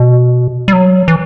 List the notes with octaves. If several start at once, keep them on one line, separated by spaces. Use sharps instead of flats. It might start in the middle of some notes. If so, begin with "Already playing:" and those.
Already playing: B2
G3
F#3
E3